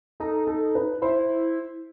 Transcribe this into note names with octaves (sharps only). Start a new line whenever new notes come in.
D#4 A4
A4
B4
E4 C5